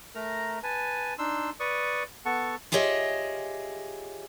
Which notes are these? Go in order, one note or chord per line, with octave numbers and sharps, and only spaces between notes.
A3 A#4 A#5
B4 G#5 A5
D4 D#4 C6 E6
B4 D5 C#6 D#6
B3 A4 F#5 A5 C#6
F4 G4 G#4 C#5 D#5 E5